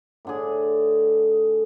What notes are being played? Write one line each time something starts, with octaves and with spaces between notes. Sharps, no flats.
A2 D3 G#4